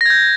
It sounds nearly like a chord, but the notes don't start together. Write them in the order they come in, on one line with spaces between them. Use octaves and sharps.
A#6 G#6 G6